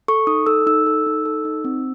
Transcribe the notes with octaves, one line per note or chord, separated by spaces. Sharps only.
A4 C#6
D#4 D#6
A4 E6
D#4 E6
A4
D#4
A4
D#4
C4